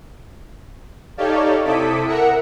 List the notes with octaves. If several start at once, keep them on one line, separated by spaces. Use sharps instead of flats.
D#4 G4 A4 C#5 D5 F5
C3 E4 A4 D6 D#6 B6
A#4 E5 F#5 A#5 C#7